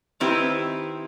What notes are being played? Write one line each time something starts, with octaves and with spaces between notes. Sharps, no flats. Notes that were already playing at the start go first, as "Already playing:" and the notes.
D#3 C4 E4 G4 B4